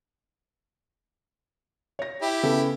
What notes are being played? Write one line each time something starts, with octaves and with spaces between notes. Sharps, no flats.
C#5 A#6
E4 G4
C#3 B3 A4